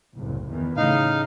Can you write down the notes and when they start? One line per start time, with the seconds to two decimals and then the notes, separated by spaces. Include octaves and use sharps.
0.15 F#1 C2 A2
0.49 E2 D#3 E3
0.77 A2 C#3 D#4 F5